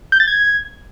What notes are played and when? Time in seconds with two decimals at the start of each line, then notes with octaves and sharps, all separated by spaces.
0.12 G6
0.20 A6
0.28 G#6